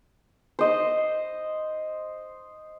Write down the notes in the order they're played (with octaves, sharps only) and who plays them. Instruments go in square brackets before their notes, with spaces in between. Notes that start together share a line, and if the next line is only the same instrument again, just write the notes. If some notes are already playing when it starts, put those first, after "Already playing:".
[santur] C5 D#5